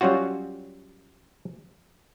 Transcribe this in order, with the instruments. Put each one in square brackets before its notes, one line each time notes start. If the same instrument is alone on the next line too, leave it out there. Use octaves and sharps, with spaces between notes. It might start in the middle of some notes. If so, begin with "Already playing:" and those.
[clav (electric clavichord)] F#3 G3 C#4 F4 F#4